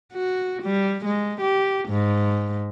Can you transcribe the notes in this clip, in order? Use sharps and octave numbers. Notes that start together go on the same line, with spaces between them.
F#4
G3
G#3
G4
G#2